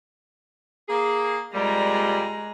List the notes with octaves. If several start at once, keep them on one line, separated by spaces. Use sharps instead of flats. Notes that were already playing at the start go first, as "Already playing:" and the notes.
A#3 G#4
F2 A#2 G3 G#3 A#5